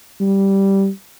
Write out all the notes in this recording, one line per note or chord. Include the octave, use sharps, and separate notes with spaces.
G3